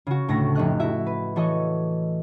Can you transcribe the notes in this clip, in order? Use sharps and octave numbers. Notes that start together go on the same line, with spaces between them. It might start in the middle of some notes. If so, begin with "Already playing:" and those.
C#3 F#4
D2 A2 A3 A5 A#6
F1 G4 D#5 F#6
E4 F#4 E5
B4
E3 F#4 A4 C#5 D#5